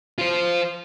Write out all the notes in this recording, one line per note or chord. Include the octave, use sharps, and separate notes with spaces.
F4 C5